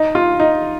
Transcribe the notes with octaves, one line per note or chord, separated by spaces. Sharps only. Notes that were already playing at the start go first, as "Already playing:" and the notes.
Already playing: D#4
F4
D#4